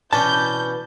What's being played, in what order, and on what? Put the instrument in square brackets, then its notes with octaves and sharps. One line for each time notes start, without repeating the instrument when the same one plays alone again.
[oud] B2 E3 [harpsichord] C#4 D4 [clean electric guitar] A5 [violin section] G6